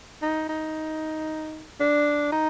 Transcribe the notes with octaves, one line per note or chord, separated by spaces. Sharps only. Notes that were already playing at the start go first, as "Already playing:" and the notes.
D#4
D#4
D4
D#4